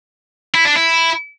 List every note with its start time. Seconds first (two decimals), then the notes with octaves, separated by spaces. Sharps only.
0.55 E4
0.65 D4
0.75 E4